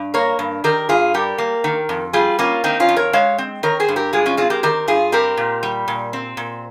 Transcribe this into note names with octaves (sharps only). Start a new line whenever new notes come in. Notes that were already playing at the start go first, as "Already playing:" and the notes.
Already playing: G2
A#3 A#4 C#5
G2
D#3 G4 A#4
G2 F4 G#4
G3 G4 A#4
A#3
D#3
F2
G3 F4 G#4
A#3 C#4 F4
D#3 C4 D#4
C#4 F4
F2
A#4 C#5
G#3 C#5 F5
C4
D#3 A#4 C#5
G#4 C5
G2
G4 A#4
G#3 F4 G#4
C#4 F4
C4 F4 G#4
G4 A#4
D#3 G4 A#4
G2 F4 G#4
C4 G4 A#4
A#2
G3
A#2
C4
A#2